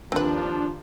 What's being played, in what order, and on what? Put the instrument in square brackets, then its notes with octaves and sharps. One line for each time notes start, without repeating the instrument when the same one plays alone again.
[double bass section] D#2 A#3 [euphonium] F3 [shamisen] C4 B4 [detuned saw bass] D4